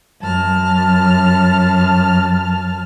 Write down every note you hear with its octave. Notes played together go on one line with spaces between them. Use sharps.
F#2 A5 F6